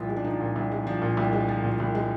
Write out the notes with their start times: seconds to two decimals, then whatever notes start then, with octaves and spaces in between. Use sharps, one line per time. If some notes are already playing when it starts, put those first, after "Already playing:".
Already playing: C2 A#2 F3 F4
0.09 G#3
0.16 D4
0.24 F3 D#4
0.41 A#2
0.56 C2
0.72 G#3
0.87 F3 D4
1.02 A#2
1.17 C2
1.33 G#3
1.48 F3
1.64 A#2
1.80 C2
1.95 G#3